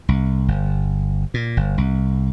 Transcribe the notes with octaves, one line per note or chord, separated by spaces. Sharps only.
C2
G1
A#2
G1
C2